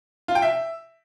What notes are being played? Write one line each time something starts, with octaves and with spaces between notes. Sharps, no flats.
F4
G5
E5